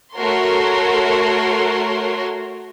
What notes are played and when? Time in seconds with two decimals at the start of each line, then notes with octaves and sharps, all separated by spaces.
0.16 A3 F#4 A#4 C#5 C6